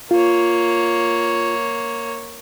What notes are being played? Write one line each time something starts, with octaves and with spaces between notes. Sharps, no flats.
A#3 F4 C#5